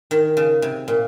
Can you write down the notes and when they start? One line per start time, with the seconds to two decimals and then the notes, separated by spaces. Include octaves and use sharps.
0.11 D#3
0.37 C#3
0.62 C3
0.88 A#2